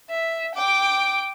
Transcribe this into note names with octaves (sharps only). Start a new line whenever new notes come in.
E5
G5 D6